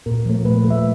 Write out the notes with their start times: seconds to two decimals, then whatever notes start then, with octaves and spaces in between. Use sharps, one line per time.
0.06 A#2 A#4
0.26 F3 A3
0.45 A#2 B4
0.64 F3 A3
0.70 E5